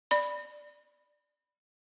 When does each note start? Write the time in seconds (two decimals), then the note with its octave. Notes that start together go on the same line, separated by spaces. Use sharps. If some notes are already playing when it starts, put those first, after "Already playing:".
0.11 D5 B5